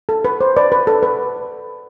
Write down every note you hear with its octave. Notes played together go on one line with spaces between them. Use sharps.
A4
B4
C5
B4 D5
B4
A4
B4